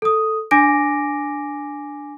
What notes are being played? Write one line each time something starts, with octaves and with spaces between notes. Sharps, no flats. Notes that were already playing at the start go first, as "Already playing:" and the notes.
A4 D#6
D4 G#5 D6 A#6 D7